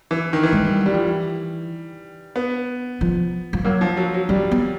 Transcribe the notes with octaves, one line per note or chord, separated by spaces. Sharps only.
E3
D#3
E3
G#3
G3
F#3
G3
F3
E3
B3
F3
F3
F#3 A#3
F3
F#3
F#3
F#3 G3
B3